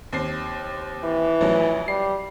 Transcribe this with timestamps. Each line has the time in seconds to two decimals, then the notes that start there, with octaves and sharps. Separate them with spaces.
0.13 D#2 C4 C7
1.03 E3
1.41 A1 F3 F#3
1.88 G3 C7